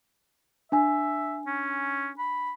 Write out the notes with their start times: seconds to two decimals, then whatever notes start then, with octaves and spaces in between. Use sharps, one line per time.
0.72 D4 E5 G#5
1.47 C#4
2.18 B5